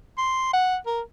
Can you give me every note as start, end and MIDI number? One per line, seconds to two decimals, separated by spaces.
0.18 0.52 84
0.53 0.76 78
0.86 1.01 70